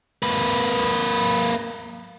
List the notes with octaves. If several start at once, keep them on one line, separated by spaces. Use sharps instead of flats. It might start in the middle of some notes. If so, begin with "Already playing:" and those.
A#3 B4